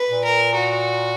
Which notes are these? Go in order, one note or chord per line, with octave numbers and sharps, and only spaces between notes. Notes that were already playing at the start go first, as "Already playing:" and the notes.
Already playing: B4
A#2
A#4
F#4